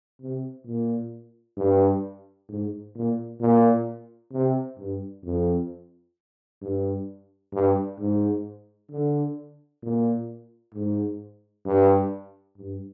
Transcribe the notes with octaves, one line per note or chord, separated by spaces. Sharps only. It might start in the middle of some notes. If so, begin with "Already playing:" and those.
C3
A#2
G2
G#2
A#2
A#2
C3
G2
F2
G2
G2
G#2
D3
A#2
G#2
G2
G2